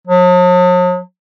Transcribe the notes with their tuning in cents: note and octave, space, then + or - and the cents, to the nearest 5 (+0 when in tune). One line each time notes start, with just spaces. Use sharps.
F#3 -45